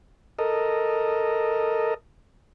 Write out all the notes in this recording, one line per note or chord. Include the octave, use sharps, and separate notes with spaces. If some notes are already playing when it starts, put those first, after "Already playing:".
A4 A#4 D#5